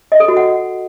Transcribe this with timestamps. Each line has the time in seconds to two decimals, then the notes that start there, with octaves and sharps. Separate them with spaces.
0.12 D#5
0.20 A4
0.28 F#4
0.37 F#5